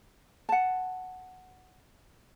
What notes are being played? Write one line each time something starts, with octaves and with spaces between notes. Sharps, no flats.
F#5 A5